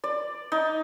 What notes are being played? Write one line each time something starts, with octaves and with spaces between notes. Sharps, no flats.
D5
D#4